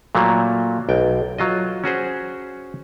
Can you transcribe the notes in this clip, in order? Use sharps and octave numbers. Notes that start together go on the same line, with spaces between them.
A#2 F#3 A3 A#3
B1 G5
F#3 F4 D#5
C#4 F#4 G#4 C5